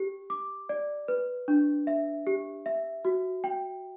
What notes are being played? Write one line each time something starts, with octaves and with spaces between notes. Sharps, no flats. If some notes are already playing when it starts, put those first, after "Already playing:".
Already playing: G4
D6
D5
B4
D4
E5
G4
E5
F#4
G5